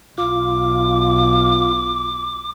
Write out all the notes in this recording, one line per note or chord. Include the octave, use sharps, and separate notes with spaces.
B1 F4 D6